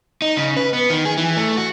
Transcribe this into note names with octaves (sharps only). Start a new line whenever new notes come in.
D#4
C#3
B4
B3
D#3
G#4
E3
A3
F#4